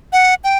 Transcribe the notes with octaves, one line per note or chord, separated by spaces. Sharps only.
F#5
G5